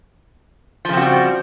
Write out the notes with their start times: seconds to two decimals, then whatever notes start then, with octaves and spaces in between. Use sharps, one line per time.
0.85 F3
0.89 C#3
0.93 C4
0.97 F#4
1.01 G3